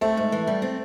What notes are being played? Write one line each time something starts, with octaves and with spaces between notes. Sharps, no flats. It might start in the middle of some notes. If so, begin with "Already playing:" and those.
A3 C4
G#2
E3
G3
C4